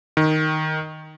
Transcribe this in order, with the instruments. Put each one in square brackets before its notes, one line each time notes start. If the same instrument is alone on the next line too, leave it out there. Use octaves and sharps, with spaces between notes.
[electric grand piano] D#3